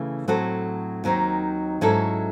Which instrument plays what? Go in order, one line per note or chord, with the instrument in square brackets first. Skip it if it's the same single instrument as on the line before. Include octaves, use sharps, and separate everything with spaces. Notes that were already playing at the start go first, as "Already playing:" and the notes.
Already playing: [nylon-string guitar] C#3 E3 A3
A2 F#3 C4 F#4 A4
D#2 D#3 F#3 C4 D#4
G#2 F#3 C#4 E4 A4